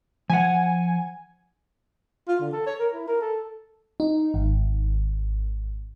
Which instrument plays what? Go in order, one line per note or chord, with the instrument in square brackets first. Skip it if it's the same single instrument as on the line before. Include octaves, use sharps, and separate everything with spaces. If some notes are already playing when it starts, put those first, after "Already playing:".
[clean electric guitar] F3 F#5 [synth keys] G#5
[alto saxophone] F4
D3
A4
C#5
A#4
E4
A#4
A4
[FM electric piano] D#4
G#1